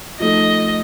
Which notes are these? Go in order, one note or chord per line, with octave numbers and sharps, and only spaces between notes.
F3 A3 D#4 A4 D#5